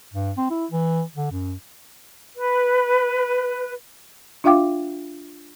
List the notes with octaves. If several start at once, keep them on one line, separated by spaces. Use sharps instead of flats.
G2
C4
E4
E3
D3
F#2
B4
D4 F4 E5 F5 G5 D6